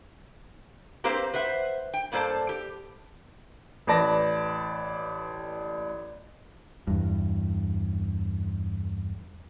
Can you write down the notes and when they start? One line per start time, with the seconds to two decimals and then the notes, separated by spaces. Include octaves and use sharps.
1.04 A#3 C4 G4 B4 C5 F5
1.34 B4 C5 E5 F#5
1.94 G5
2.12 G2 A#3 A4 C5 D5 A5
2.49 G4
3.87 A1 B4 D5 A5 A#6
6.87 E2 G2